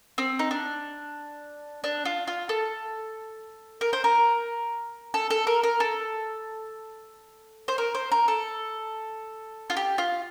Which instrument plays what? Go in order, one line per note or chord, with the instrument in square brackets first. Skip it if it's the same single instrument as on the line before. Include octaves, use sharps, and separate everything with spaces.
[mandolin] C4
D#4
D4
D4
F4
F4
A4
A#4
C5
A#4
A4
A4
A#4
A#4
A4
C5
A#4
C5
A#4
A4
F4
G4
F4